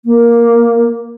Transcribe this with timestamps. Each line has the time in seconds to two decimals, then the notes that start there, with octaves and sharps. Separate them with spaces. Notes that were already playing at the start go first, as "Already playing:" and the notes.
0.05 A#3